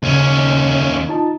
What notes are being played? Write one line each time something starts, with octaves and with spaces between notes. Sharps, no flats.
D#2 C#3 C#4
D#4 F4 A5